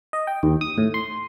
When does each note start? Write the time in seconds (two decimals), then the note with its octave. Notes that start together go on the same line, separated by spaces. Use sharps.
0.13 D#5
0.27 G5
0.43 D#2
0.61 D#6
0.78 A2
0.94 C6